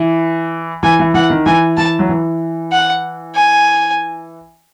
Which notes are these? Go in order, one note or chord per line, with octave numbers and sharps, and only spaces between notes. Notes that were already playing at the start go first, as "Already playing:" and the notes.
Already playing: E3
E3 G#5
E3
E3 F#5
D#3
E3 G#5
E3 A5
F#3
E3
F#5
G#5